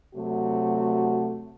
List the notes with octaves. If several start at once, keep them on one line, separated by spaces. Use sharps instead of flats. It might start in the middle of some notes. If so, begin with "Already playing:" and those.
C3 F#3 A3 F#4